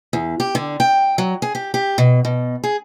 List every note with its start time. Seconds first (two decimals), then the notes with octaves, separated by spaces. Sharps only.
0.13 E2
0.40 G4
0.55 D3
0.80 G5
1.18 F#3
1.42 G#4
1.55 G4
1.74 G4
1.98 B2
2.25 B2
2.64 G#4